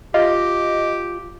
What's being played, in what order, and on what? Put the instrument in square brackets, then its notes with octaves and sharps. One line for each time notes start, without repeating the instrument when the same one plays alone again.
[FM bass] F4 [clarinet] G4 [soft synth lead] D#5